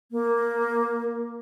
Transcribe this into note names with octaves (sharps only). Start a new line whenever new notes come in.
A#3